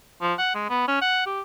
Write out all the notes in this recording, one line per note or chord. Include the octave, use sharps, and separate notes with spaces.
F3
F#5
G#3
B3
C#4
F#5
G4